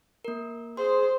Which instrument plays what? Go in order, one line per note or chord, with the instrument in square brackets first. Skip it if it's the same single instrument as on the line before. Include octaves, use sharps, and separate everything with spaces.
[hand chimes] A#3 A#4
[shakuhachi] G#4 [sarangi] C5 [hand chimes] C6